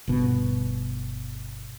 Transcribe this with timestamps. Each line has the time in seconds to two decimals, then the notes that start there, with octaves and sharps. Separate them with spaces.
0.07 G1 B2